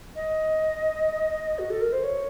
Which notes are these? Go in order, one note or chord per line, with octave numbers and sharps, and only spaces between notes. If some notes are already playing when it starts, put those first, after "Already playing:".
D#5
F#4
A4
A#4
C5
C#5